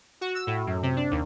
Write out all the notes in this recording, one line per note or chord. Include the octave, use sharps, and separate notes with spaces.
F#4
E6
A2
F#2
C3
D4
D#2